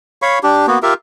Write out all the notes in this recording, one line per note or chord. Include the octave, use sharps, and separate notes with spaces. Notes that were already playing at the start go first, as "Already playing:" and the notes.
C#5 F5 B5 C#6
D4 G4
A#3 B3 F#4
F4 G4 A#4 E5